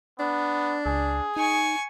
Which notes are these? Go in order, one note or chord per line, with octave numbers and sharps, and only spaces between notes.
B3 D4
C#2 G#4
D#4 G#5 C#6